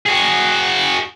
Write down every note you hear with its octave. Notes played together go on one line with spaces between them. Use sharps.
F#4 G#4